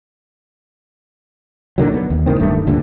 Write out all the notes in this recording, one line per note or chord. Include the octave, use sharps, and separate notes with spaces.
A#2 D3 D#3 F#3
B3
D#2
C#2 A#2 D#3 C4
D1 G2 D#3 A3
D2 G2 A#2 D3